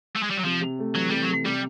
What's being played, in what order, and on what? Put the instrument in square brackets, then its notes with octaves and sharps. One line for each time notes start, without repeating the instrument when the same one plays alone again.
[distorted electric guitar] A3
G#3
G3
F#3
[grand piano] C3 [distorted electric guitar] F3
[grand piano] C3
A3
[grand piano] E3 [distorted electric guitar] F#3
[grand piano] C3 [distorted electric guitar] G3
[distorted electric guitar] F#3
[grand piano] C3
[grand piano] C3 [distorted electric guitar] G3